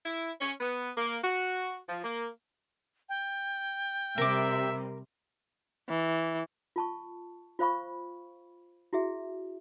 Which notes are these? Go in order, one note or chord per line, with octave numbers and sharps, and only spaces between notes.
E4
C#4
B3
A#3
F#4
F3
A#3
G5
C3 G3 A#4 E5 D6
E3
F4 A5 C#6
F4 C5 F5 B5 C#6
E4 F#4 G#4 E5